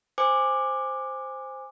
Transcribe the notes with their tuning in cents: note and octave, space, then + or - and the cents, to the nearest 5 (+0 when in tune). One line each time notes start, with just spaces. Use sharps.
C5 +0 G#5 -20 D6 +10